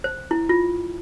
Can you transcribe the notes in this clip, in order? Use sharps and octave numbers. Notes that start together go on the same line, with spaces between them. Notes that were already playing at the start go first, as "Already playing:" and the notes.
C5
E4
F4